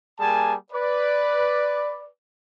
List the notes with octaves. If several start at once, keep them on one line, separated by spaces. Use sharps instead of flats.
G3 A#3 G#4 G#5 A5
B4 D5